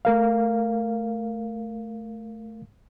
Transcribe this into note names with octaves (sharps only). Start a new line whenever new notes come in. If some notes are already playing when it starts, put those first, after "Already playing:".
A3 A#4 F5